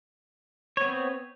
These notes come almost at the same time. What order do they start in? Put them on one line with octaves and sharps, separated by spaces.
C#5 B3 C4